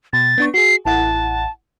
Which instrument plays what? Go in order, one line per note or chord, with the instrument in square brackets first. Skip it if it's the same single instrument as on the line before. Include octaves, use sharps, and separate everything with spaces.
[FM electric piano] B2 [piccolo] A6
[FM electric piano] B3 D4 C#6
[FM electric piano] F#4 G#4 [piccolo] C7
[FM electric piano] A1 E4 F#5 [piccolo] A5